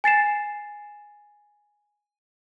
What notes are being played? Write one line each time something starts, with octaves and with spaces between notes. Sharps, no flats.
G#5 A6 C7 E7